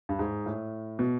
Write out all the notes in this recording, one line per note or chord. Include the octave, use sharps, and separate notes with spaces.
G2
G#2
A2
B2